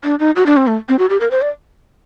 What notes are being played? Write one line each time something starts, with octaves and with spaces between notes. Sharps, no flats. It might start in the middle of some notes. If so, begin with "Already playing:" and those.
D4
D#4
F#4
D4
C4
A3
C4
F#4
G4
A#4
C5
D5